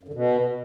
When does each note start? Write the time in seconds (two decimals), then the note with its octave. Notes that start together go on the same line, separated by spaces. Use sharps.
0.03 F#2
0.08 D3
0.14 B2